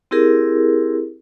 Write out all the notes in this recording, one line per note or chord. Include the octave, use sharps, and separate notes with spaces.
C4 E4 G4 G#4 A#4